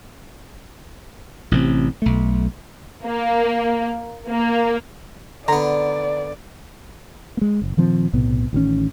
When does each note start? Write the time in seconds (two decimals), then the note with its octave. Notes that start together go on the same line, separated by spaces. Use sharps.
1.51 A1 C3 D#3 C4
2.02 B1 A3
3.05 A#3
4.28 A#3
5.48 D3 B3 D5 A#5
7.37 G#3 A#3
7.62 F#1
7.77 A#2 D#3 F3 C4
8.13 B1 A2 C3 B3
8.53 A1 D#3 E3 C#4